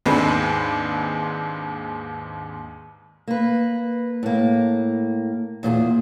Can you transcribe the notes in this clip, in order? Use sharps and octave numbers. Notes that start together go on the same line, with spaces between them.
D#2 G#2 G#3 C4 D4 B4
A#3 B4
A2 A#3
E2 A#2 F#4 G#4